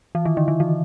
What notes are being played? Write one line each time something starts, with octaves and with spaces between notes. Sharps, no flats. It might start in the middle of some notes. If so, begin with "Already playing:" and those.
E3
D#3
D3
D#3
E3